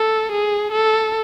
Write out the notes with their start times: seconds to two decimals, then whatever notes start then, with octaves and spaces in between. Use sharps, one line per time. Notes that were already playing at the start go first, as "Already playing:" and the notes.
Already playing: A4
0.32 G#4
0.72 A4